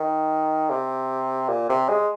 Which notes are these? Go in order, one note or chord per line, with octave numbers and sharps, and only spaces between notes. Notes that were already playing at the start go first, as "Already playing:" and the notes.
Already playing: D#3
C3
A#2
C3
G#3